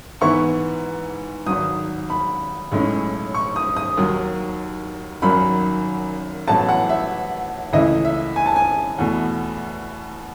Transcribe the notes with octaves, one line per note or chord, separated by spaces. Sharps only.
G#2 E3 B3 E4 C#6
G#1 G#2 F#3 D#6
B5
B1 A2 G#3 C#4
C#6
D#6
D#6
D#2 D#3 F#3
G#1 F#2 D#3 F#3 B5
A1 A2 F#3 B3 A5
F#5
E5
C#2 C#3 E3 A3 E4 D#5
E5
G#5
A5
G#5
E2 B2 A3